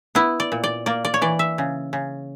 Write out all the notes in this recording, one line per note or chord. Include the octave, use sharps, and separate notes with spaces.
B3 E4
D5
A#2
D5
A#3 D5
D5
C#5
E3 D5
E5
C#3
C#3